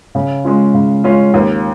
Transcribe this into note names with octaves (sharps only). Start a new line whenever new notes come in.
C#3
G#3 C#4 F4
C#3
G#3 C#4 F4
D#2